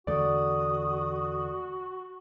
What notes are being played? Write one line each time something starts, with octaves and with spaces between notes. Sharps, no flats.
E2 D3 A3 F#4 D5 D#6